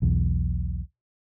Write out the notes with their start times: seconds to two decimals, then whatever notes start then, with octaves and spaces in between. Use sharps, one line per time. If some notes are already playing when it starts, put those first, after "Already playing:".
0.02 B1 E2